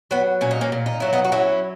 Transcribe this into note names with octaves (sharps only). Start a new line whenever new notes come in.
F#3 B3
A#2 C#4
D#4
A#3 C#4
A#2
D#4
F#3 E4
B3 D#4
F#4
F#3 C#4 E4